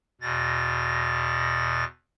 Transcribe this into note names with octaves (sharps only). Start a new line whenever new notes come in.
E2 B2 A6 A#6